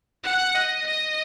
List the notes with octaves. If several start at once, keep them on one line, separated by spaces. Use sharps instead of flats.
F#5
D#5
D#5